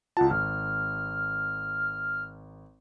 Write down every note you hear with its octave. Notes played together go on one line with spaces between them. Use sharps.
C#2 F4 F#5 A5
G#1 F6